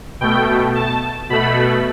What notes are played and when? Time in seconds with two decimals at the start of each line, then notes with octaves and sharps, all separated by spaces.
0.21 B2 A3 G5
0.75 A5
1.30 B2 A3 B5